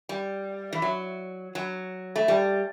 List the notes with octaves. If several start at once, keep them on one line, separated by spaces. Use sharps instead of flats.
G3
E3
F#3
F#3
A3
G3